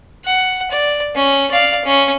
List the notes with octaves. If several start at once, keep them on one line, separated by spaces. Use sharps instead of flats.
F#5
D5
C#4
D5 F5
C#4